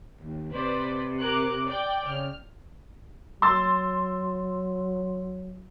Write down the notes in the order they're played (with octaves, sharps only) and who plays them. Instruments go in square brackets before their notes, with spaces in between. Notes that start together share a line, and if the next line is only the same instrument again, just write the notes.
[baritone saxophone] D#2
[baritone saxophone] C3 [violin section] B4 C5 D5
[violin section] A#4 D6 F#6
D5 G5
[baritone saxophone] C#3 [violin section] F6
[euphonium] F#3 [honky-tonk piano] C6 E6 A6